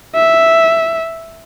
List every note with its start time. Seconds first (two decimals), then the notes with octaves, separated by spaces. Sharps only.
0.15 E5